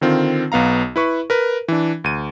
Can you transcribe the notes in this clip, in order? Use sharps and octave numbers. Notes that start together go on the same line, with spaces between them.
D3 D#3 C4 F4
B1 B3 F5 A#5
E4 B4 C#6
A#4 B4
E3 D4
D2 D#7